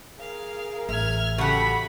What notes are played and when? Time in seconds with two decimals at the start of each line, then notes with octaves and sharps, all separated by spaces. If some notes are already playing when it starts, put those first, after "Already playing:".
0.19 G#4 A#4 F5
0.89 A1 E5 F6 G#6
1.38 C#3 F#4 G4 A4 F#5 B5